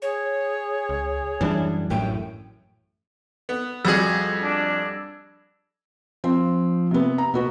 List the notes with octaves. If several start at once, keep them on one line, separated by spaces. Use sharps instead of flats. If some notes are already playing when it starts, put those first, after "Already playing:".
G#4 C#5
C#2
F#2 E3 G3 D4
A1 F#2 A2 G5
B3
F2 G3 F#4 G#4 E6 G#6 A#6
D4
F3 C4
C3 B3
A#5
B2 B3 F#4 B4